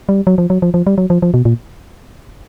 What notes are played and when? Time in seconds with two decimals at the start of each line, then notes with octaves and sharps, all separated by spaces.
0.09 G3
0.27 F#3
0.38 F3
0.50 F#3
0.62 F3
0.74 F3
0.87 G3
0.98 F#3
1.10 F3
1.22 F3
1.34 B2
1.45 A#2